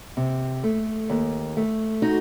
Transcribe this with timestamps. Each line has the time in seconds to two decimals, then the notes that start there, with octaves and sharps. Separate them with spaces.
0.17 C3
0.64 A3
1.10 D#2
1.57 A3
2.02 D#4 F#4